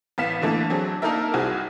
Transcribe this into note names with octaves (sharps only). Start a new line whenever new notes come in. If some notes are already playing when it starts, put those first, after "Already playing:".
A1 B3 F5 B6 E7
D3 E3 A3 A#3 D4
F#3 C4 D4 G#4
A#3 D4 D#4 A4 A#4 E5
C2 C4 F#4 G#4